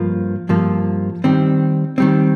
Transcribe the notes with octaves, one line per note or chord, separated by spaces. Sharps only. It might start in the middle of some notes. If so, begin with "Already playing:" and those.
Already playing: G2 F3 A#3 F4
G2 F3 A#3 F4
D#3 G3 C4
D#3 G3 C4